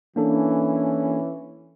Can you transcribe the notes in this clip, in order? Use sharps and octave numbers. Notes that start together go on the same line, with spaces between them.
E3 A#3 C#4 D4 A4